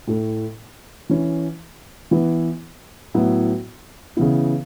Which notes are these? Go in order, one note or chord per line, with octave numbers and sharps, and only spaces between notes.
A2 A3 E4
E3 C#4 E4
E3 B3 E4
A2 F#3 B3 E4
C#3 E3 B3 E4